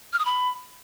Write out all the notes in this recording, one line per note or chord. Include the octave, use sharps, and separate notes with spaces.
F6
D#6
B5